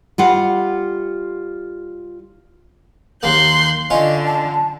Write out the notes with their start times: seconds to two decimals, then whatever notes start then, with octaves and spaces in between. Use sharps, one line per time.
0.18 G3 F4 F#5
3.23 D#2 A#3 C6 F#6 G6
3.90 D3 C#4 F4 D#5
4.25 A5